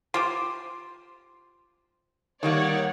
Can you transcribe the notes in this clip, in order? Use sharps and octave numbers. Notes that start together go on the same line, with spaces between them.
F4 G4 C5
D#3 G3 A#3 C#5 D5 F#5